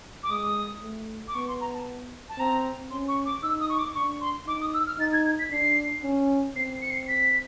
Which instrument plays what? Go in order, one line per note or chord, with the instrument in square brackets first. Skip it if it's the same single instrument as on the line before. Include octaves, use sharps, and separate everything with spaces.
[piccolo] D6
[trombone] G#3 [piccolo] D#6
[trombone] A3
[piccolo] D6
[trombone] B3 [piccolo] C#6
[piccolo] C6
A#5
A5
A5
[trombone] C4 [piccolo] A#5
[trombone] C#4 [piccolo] C6
[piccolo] C#6
D6
[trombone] D#4 [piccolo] E6
[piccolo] D#6
C#6
D6
[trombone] D4 [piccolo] C#6
[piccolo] C6
[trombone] D#4 [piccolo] D6
[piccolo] D#6
E6
F6
[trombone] D#4 [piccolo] A6
[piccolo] G#6
G#6
B6
[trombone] D4 [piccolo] C7
[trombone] C#4
[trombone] C4 [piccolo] C7
[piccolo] C#7
C7
B6